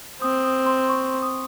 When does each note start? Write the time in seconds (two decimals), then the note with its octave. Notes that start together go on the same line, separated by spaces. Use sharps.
0.21 C4 D#6
0.44 D#6
0.66 C6
0.89 C#6
1.22 D#6